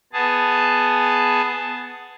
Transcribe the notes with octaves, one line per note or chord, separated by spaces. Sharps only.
B3 G#4 A5